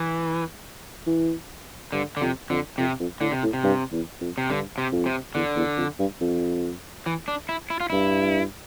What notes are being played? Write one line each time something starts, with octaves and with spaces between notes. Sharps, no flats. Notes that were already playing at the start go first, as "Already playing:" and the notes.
Already playing: E3
E3
G2 D3
D3
F2 C3
F2 D3
F2 C3
F2
A2 D3
C3
A2
C3
G2
E2
F2
C3
G2 D3
C3
F2
C3
E2 D3
E2
F2
G2
F2
E3
D4
E4
E4
F4
G2 E4